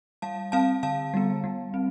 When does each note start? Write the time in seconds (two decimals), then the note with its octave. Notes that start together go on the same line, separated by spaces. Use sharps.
0.22 G3 F5 A5
0.52 C4 F5 A5
0.83 D3 F5 A5
1.14 G3 B3
1.44 G3
1.74 C4